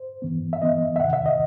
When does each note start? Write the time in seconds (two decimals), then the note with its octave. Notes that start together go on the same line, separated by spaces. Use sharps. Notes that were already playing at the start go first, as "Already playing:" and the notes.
Already playing: C5
0.22 G2 E3 B3
0.53 E5
0.60 G2 E3 B3 D#5
0.96 E5
1.00 E2 C3 D#3 F#5
1.13 E5
1.26 D#5